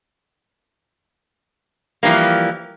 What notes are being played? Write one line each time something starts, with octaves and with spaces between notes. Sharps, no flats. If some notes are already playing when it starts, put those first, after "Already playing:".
E3 F3 G3 A#3